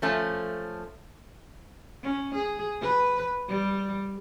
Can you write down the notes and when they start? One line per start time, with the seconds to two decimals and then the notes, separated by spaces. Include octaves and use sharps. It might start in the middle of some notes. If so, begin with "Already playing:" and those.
0.02 F3 A3 C#4
2.03 C#4
2.35 G#4
2.82 B4
3.48 G3